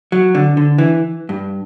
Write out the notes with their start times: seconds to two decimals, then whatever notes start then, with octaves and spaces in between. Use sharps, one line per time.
0.12 F#3
0.35 D3
0.57 D3
0.78 E3
1.29 G2